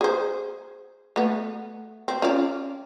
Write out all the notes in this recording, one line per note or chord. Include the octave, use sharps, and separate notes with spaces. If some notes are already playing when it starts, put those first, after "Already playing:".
G#4 C5
A3 B3
C4
C#4 F4 D5